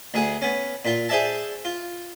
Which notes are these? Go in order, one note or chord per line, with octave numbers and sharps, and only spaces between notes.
D2 G#4 F#5
B3 C#4
A#2 F4
G#4 C5 D5 E5 A5
F4